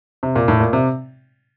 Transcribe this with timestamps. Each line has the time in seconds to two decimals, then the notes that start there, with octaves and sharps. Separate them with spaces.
0.23 C3
0.36 A#2
0.48 A2
0.60 A#2
0.73 C3